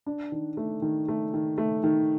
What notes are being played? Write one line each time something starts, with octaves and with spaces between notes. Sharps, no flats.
D4
D#3
A3
D#3
A3
D#3
A3
D#3